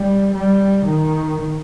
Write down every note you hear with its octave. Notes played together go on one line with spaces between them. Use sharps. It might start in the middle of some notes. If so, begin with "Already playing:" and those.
Already playing: G3
G3
D#3